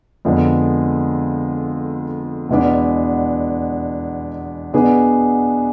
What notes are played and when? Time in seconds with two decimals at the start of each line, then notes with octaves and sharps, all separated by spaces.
0.25 F2 D3 G#3 B3
2.49 E2 B2 G#3 B3 D4
4.73 B2 B3 D4 G#4 B4